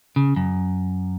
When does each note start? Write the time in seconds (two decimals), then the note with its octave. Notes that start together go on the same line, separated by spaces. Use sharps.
0.16 C#3
0.36 F#2